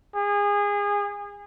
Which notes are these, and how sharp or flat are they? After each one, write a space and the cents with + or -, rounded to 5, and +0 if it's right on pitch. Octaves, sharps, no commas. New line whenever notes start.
G#4 -30